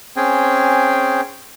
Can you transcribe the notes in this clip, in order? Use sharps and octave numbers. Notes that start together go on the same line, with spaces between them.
C4 C#4 G#4 G5